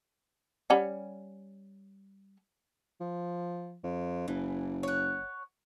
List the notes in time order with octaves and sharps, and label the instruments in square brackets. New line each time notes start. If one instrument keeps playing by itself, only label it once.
[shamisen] G3 C#4 F#5
[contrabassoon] F3
F2
[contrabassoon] F#1 [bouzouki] E3
[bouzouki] C#5 F#5